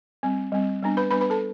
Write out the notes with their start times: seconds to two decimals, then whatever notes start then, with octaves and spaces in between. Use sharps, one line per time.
0.23 G3 C4
0.52 G3 C4
0.82 G3 B3 D4
0.97 B4 B5
1.11 G3 B3 D4 B4 B5
1.21 B4 B5
1.30 A4 A5